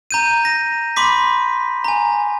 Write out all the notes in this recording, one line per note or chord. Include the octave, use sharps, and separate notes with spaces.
A#5 G6 D#7
A#6
B5 C6 D6 B6
G#5 A#5